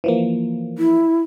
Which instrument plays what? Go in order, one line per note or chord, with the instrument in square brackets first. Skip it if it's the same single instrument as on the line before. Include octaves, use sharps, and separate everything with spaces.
[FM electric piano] E3 F3 A#3
[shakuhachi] E4